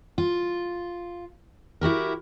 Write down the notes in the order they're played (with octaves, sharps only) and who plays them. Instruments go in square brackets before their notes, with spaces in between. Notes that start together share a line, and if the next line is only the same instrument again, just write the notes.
[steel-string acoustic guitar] F4
E4 F#4 G4 A#4